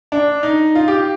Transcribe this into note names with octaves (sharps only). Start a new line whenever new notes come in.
D4
D#4
F4
G4